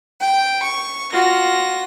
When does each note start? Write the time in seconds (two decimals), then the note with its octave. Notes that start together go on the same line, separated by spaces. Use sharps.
0.21 G5
0.65 C#6
1.11 F4 F#4 A#6